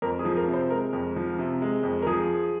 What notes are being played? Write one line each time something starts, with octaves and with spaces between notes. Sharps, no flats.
F2 A#4
G#4
F3
A#4
C3
C5
G#3 A#4
F2
F3
C3
G#3
F2
A#4
F3 G#4